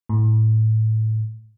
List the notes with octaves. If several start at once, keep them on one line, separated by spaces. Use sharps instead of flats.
A2